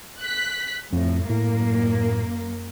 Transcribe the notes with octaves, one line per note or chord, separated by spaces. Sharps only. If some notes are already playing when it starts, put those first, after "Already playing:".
F#6 B6
F2 A2
F#2 A2 A#3